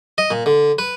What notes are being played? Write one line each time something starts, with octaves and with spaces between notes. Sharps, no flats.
D#5
A#2
D3
B4